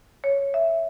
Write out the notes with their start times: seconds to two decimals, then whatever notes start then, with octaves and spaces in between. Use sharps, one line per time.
0.24 C#5
0.54 E5